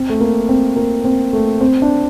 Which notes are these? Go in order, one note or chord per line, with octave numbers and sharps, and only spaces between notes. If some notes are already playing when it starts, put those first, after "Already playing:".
Already playing: C4
A3
A#3
C4
A#3
C4
A3
C4
D4